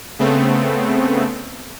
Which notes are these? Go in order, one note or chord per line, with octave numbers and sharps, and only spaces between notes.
C#3 A3 B3 C4